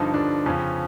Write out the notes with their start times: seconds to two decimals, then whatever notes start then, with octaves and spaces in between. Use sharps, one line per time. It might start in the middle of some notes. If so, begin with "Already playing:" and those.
Already playing: G2 D3 F3 D#4
0.14 G2 D3 F3 D4
0.46 F2 C#3 F3 C#4